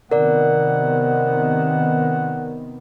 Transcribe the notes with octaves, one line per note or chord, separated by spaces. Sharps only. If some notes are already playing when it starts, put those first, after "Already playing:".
C3 D#3 B3 A#4 D5 F#5